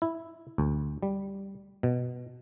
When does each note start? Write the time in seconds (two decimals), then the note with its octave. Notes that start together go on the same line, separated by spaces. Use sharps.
0.02 E4
0.58 D2
1.03 G3
1.83 B2